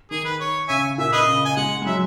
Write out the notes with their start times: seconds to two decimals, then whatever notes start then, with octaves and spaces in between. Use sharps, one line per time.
0.11 D#3 G#4
0.25 B4
0.40 C#5
0.69 C#3 C#5 E5 G#5
0.98 A#2 E5
1.12 G#4 B4 D#5
1.28 C#3
1.45 G#5
1.57 G#3 F#5
1.82 G#3
1.86 F#3 E5